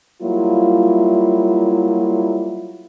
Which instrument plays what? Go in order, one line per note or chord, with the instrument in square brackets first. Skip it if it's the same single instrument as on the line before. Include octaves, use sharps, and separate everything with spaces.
[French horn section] F#3 G3 A#3 E4 F4